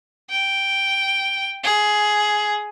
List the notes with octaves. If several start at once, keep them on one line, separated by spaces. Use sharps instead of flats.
G5
G#4